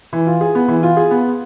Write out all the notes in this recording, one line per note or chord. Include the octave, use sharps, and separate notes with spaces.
E3
F4
G#4
B3
E3
F4
G#4
B3